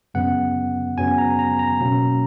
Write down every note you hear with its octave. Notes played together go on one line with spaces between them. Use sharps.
F#2 C#3 F#3 B3 F#5
F#2 C#3 F#3 B3 G#5
A#5
A#5
A#5
B2 F#3 A#3 C#4